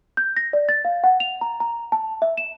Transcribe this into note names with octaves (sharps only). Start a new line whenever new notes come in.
G6
A#6
D5
A6
F5
F#5
F7
A#5
A#5
A5
E5
E7